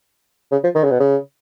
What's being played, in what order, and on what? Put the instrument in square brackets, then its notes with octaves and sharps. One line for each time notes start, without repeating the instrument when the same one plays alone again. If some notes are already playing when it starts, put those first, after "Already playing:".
[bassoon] C#3
F3
D#3
C#3
B2
C#3